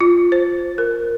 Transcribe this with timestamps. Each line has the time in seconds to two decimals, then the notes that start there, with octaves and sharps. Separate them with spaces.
0.01 F4
0.32 C5
0.78 A#4